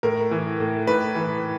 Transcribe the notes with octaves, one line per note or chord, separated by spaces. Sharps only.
A2 A#4
E3
A2
A2 B4
E3